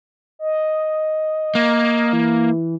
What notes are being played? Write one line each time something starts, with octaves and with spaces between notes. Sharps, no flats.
D#5
A#3
E3